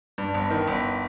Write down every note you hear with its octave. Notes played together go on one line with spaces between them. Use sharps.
G2
G1
D#3
G1